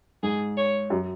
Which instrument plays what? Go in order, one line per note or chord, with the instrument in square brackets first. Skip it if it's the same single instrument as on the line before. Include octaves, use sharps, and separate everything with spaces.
[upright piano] G#2 [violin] G#4
[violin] C#5
[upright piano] F#2